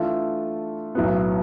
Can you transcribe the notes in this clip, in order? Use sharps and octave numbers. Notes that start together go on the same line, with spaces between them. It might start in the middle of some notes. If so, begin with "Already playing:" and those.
Already playing: E3 A3 D4 F4 A4
B1 A2 F#3 B3